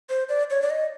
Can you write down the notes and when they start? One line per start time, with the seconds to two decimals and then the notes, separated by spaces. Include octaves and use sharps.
0.10 C5
0.29 D5
0.50 C#5
0.62 D5
0.70 D#5